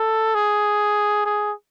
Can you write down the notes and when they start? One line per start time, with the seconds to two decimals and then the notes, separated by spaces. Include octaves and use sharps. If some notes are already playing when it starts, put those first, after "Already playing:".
Already playing: A4
0.35 G#4
1.26 G#4